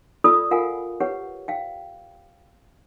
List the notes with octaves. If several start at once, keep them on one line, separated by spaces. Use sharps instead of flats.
F4 A4 D5 B5 D#6 E6
F4 A#4 F5 F#5 G#5
G4 B4 C#5 F#5
F5 G5